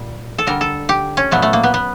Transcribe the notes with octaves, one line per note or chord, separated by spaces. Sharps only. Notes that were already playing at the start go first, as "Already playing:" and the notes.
Already playing: A#2 G3
A4
D3 G3 A#4
A4
G4
C#4
A#2 F#3 A3 B3
A3
A#3
B3
B3